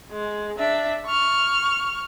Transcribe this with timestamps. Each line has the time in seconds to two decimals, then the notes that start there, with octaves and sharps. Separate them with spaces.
0.12 G#3
0.58 D4 E5
1.06 C#6 F6